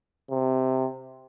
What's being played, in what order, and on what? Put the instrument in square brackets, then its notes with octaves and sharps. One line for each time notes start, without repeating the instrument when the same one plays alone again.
[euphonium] C3